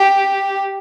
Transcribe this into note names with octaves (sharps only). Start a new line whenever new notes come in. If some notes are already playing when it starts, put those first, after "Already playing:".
Already playing: G4